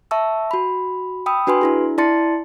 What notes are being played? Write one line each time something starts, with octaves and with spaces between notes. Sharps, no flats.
E5 A5 C#6 E6
F#4 B5
G5 B5 D#6 E6
D4 F#4 B4 G#5 C6
D4 E4 G#4
E4 D5 A5 C6 A6 C#7